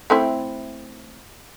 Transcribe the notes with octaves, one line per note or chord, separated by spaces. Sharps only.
A3 C4 E4